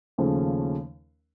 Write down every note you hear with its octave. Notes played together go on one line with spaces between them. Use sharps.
D#2 C#3 F3 A3 C#4